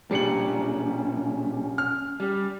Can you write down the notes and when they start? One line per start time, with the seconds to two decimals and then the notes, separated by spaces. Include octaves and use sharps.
0.11 B1 A#2 G3 C#4 D4 C#7 F#7
1.78 F6
2.20 G3